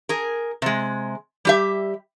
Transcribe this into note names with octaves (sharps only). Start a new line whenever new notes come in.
G#4 A#4
C3 G#3
G3 G4 E5